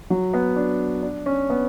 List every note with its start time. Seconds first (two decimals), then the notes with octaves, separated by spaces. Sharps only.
0.10 F#3
0.34 B3
0.56 D4
1.03 D4
1.26 C#4
1.50 B3